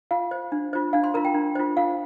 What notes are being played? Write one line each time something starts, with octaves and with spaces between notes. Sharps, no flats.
F4 F5
C5
D4
F4 C5
D4 F5
C6
F4 A#4 A#5
G5
D4
F4 C5
F4 F5